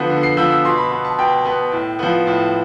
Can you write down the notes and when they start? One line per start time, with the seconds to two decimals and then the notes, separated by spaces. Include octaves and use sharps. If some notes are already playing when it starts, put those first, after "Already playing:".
Already playing: D3 F3 B3
0.10 D3
0.23 C7
0.37 F3 B3 E6
0.50 E6
0.65 B2 C6
0.78 B5
0.92 B3 B5
1.05 A5
1.18 B2 G5
1.45 B3
1.72 A2
1.99 F3 B3
2.27 A2